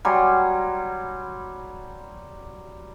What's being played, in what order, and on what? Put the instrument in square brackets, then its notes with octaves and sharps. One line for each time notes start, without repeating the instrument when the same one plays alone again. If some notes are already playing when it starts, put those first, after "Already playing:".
[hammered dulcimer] F#3 G3 G#5 C6